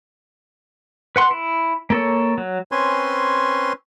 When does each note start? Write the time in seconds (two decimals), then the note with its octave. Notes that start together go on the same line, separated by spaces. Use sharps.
1.16 B4 F#5 C6
1.31 E4
1.90 A#3 A4 C#5
2.38 F#3
2.72 C4 C#4 B4 C#5 G#5 C6